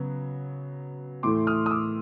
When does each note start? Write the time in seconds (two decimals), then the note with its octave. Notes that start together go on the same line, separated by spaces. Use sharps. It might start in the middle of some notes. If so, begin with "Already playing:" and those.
Already playing: C#3 F#3 B3
1.23 A2 E3 A3 C6 D6
1.47 D#6 F6
1.66 D#6
1.71 D6 E6